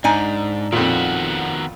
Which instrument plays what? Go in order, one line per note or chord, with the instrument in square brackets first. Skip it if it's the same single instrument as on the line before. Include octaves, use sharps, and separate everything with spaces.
[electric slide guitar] G#2 [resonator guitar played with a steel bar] D4 D#4 G#5
[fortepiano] F2 A#2 [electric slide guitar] D#3 B3 F#4